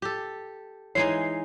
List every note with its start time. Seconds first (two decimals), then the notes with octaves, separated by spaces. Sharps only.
0.02 G4 A4
0.95 E3 G#3 D#4 C#5 C7